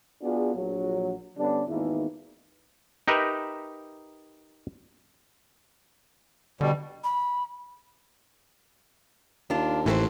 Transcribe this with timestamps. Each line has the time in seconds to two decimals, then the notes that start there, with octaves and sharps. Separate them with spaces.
0.23 B3 D4 F4 F#4 G#4
0.55 A#1 F#3
1.38 D3 G3 B3 C#4 D4
1.68 G#1 E2 D#3 E3 A#3 E4
3.08 D#4 G4 A#4 B4 E5
6.61 B2 D3 G3
7.04 B5
9.50 D#2 D4 F4
9.86 A1 A2 E3 B4 C5